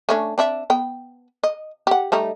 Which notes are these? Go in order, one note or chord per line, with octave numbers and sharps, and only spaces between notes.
A3 C#4 D4
C4 D4 E5
B3 G5
D#5
G4 F#5
G3 A3 D#4